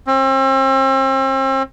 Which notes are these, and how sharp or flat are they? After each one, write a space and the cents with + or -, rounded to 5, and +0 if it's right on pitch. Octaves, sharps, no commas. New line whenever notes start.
C4 +40